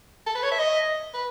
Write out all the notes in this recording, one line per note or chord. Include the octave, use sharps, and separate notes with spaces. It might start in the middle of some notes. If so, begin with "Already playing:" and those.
A4
B4
C#5
E5
D#5
B4